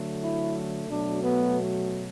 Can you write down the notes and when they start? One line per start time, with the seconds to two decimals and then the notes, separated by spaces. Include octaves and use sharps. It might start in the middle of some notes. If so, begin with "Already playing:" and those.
Already playing: D3 F#3 A3
0.23 E4
0.90 B2 F#3 A3 D4
1.23 B3